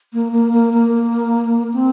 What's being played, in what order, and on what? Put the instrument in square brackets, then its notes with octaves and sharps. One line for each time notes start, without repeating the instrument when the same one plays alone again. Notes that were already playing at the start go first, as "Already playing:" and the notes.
[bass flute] A#3
A#3
A#3
A#3
C4